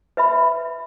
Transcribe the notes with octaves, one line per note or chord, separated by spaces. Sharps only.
B4 E5 B5